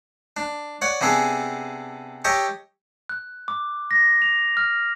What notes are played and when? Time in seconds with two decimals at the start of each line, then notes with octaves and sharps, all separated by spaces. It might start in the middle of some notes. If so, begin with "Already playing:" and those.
0.37 D4
0.82 C#5 D5 F#5
1.01 C3 B3 D4 G#4 A4
2.25 G4 A4 C#5 D#5 G5
3.09 F#6
3.48 D6
3.91 A#6
4.22 F7
4.57 F6